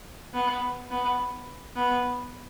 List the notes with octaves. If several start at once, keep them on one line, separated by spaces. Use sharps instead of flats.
B3
B3
B3